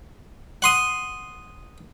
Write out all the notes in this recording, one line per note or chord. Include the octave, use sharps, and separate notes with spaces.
F#5 C6 D#6